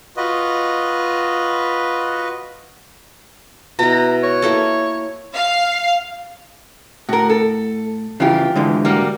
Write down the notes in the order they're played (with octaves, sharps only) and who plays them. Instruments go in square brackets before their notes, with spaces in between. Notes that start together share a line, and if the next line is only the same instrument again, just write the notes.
[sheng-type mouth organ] F4 F#4 B4 D#5
[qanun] B2 E4 [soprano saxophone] A#5
[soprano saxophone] C#5
[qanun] A#3 E4 A4
[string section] F5
[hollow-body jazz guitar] A2 [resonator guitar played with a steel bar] F#4 A#4
[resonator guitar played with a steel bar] A4
[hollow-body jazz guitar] C#3 E3 [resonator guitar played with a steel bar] F4 G4
[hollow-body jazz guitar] G#2 D3 E3
[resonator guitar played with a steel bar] G3 A#3 F#4